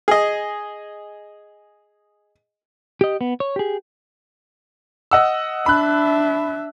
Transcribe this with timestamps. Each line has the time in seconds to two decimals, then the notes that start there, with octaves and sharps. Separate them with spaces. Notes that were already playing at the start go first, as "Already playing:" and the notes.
0.08 G#4 D#5
3.01 G4 D#5
3.21 B3
3.40 C#5
3.56 G4 G#4
5.11 D#5 F#5 E6
5.66 D4 E5 B5 F#6